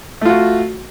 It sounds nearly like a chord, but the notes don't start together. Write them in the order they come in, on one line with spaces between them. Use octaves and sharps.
A3 F4 F#4